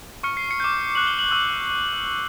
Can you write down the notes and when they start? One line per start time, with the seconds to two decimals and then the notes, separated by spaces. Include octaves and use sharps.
0.23 C#6 F6 C#7
0.37 C7
0.51 C#7
0.60 D6 G6
0.95 C#6 F#6 F#7
1.07 G7
1.19 F#7
1.31 C#6 E6 G6 F#7